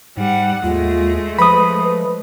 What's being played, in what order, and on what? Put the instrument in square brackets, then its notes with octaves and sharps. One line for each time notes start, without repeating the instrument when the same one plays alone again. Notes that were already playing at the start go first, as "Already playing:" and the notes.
[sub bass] G#2 [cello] G3 F#5
[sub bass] D#2 [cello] G#3 A3 [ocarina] F4
[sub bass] F3 [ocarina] B4 [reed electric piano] B5 D#6